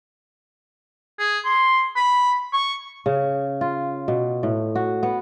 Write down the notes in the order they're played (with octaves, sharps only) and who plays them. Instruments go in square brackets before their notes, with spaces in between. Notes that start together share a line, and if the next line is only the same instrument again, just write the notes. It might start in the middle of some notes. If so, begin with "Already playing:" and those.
[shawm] G#4
C6
B5
C#6
[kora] C#3
F4
B2
A2
F#4
B3